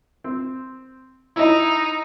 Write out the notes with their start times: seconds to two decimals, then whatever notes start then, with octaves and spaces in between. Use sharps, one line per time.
0.24 C4
1.36 D#4 E4 D#5